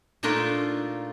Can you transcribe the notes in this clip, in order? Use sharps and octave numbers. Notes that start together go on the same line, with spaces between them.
A#2 A3 D4 D#4 F4 A#4